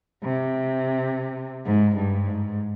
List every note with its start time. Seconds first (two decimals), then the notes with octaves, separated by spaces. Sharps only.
0.24 C3
1.65 G#2
1.96 G2
2.27 G#2